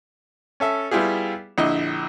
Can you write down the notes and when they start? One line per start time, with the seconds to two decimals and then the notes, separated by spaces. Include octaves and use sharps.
0.60 C#4 A4 E5
0.91 G3 B3 E4 F4 G4 G#4
1.58 A#1 D3 E4 D#5